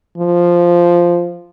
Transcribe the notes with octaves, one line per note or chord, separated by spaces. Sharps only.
F3